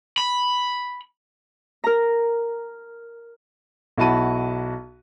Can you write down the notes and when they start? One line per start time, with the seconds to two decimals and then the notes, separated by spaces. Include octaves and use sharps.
0.18 B5
1.84 A#4 A#5
3.97 B1 E4 F#4 A5 B5 D#7